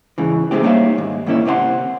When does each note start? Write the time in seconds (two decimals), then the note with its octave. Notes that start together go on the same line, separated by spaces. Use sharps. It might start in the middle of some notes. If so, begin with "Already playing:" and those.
0.18 G#2 C#3 E3
0.51 A2 C3 G#3 A3 C4 G4
0.63 G3 A#3 D#4 C#5 E5 F5
0.98 D#2 G#2
1.26 G#2 D#3 A#3 C#4 E4
1.45 C3 B3 C4 D#5 F#5 C6